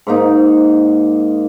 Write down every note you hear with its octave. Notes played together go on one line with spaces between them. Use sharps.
G#2 A#3 D#4